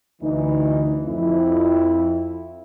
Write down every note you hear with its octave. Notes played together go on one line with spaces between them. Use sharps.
D2 E3 D#4
F2 E4